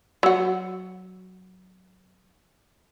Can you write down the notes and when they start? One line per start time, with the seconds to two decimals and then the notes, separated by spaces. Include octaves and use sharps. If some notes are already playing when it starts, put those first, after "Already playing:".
0.23 F#3 F#4